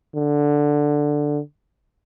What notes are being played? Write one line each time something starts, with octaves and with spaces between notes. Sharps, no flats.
D3